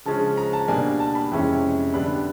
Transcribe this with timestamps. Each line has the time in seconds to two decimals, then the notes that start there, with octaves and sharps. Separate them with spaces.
0.05 C#3 F3 G#3 C#4 A5
0.37 A#5
0.53 A5
0.68 B2 G3 A#3 D4 G#5
1.00 A5
1.15 B5
1.32 F2 C3 E3 G#3 C#4
1.94 D3 G3 B3 D4 B5